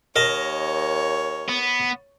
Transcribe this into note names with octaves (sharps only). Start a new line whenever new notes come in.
D#2 A#4 C#5 D#5 A5
B3